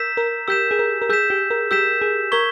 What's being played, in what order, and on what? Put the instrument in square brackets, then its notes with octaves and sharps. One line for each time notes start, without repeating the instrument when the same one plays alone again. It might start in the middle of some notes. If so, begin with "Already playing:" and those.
Already playing: [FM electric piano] A#4 [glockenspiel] E6 G6 B6 E7
[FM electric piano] A#4
[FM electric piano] G4 [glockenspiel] E6 G6 B6 E7
[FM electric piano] G#4
A#4
A#4
[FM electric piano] G#4 [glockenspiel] E6 G6 B6 E7
[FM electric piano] G4
A#4
[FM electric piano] G4 [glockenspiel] E6 G6 B6 E7
[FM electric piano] G#4
[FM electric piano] A#4 [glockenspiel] C#6 G#6 B6 G7